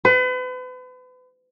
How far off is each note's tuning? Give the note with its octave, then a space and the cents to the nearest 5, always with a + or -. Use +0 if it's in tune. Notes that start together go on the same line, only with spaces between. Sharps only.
B4 +40